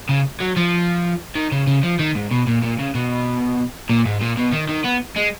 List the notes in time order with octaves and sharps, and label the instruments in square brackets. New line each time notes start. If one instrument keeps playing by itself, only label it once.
[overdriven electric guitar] C#3
F#3
F3
D#3
C#3
C#3
F3
D#3
G#2
B2
A#2
A#2
C#3
B2
A#2
G#2
A#2
B2
D#3
D#3
B3
G#3